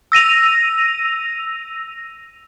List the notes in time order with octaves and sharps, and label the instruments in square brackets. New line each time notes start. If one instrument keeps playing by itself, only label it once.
[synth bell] E6 A#6 D#7 F7